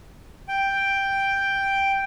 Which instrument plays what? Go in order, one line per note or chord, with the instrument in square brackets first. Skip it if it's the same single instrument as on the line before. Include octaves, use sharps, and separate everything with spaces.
[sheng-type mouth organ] G5